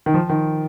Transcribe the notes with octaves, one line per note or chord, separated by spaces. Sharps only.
D#3
F3
D#3